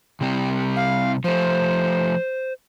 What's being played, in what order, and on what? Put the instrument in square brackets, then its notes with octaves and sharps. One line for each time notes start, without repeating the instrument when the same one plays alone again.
[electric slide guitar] C3 G3 C4
[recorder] F5
[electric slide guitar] F3 A3 [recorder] C5